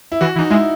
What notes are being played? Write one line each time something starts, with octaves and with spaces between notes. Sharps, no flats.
E4
E3 F#4
E3
D#4
G#3 E4